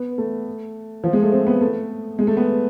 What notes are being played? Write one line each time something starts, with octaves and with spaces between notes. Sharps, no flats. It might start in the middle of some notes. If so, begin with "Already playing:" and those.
Already playing: B3
A3
F3
G#3
A3
C4
B3
A3
G#3
A3
B3